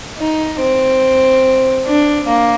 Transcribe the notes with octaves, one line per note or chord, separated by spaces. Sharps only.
D#4
C4
D4
A#3